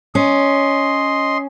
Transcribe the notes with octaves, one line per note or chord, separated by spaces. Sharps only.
C#4 D#5 C6